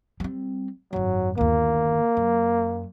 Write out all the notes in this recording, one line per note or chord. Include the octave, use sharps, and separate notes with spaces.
G3 C4
G#1 F#2 F#3
G1 D#2 A#3
F#2